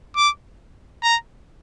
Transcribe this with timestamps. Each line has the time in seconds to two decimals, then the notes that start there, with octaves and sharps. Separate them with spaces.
0.16 D6
1.03 A#5